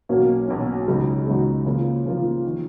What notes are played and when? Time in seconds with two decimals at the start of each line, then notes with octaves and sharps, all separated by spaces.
0.09 B1 B2 F#3 A#3 C#4
0.48 B1 B2 F#3 A#3 C#4
0.88 C#2 C#3 G#3 D#4 F#4
1.27 C#2 C#3 G#3 D#4 F#4
1.66 C#3 F3 A#3 F4
2.05 C#3 F3 A#3 F4
2.46 D#3